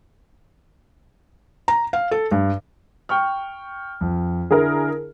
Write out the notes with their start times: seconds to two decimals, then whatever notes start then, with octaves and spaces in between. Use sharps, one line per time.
1.68 A#5
1.93 F5
2.11 A4
2.32 G2
3.09 G5 C#6 F6
4.01 F2
4.51 D3 E4 G#4 A#4